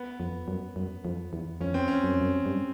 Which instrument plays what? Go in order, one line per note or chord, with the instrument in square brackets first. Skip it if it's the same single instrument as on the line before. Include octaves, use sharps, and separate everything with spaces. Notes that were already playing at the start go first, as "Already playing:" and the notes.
Already playing: [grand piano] B3
[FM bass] F2
F#2
F#2
F2
E2
[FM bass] F2 [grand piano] C#4
[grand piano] C4
C#4
[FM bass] F#2
F2
F#2
G2